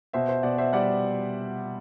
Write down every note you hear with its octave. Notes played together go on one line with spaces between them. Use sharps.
B2 C5 E5
C5 E5
B2 D5 F#5
C5 E5
G3 D5 F#5